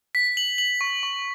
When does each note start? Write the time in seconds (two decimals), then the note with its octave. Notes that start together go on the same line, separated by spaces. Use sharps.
0.15 B6
0.37 F#7
0.58 F#7
0.81 C#6
1.03 C#6